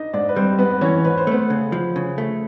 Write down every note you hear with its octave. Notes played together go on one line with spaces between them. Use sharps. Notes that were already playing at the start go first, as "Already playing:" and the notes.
Already playing: D4 D#4 D#5
G#2 D4 D5
B4
G3 C4 C5
G#2 B3 B4
E3 C#4 C#5
G#2 B4
C5
A3 B3 B4
C#3
F3
C#3
A3